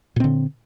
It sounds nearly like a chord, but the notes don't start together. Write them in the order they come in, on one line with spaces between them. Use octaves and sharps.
A#2 C4 D3